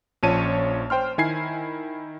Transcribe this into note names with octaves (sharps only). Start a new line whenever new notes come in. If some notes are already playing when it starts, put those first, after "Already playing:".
A#1 F3 C#4 C#5 A5 D#7
C5 G5 C6 F6
D#3 E4 G#5 G#6 C7